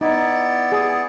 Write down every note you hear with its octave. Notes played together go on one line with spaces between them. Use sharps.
B3 D#4 E4 D5
G#4